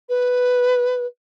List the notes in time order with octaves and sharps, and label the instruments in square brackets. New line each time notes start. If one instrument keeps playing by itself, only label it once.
[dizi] B4